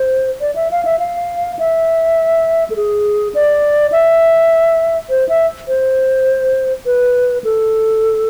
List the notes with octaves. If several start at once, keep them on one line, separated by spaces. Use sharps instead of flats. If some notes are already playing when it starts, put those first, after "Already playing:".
Already playing: C5
D5
E5
F5
E5
F5
E5
A4
G#4
D5
E5
C5
E5
C5
B4
A4